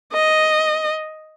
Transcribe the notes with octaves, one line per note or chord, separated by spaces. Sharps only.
D#5